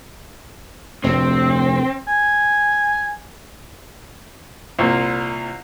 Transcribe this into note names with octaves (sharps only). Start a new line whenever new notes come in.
F1 D2 A2 C4
G#5
C2 A#2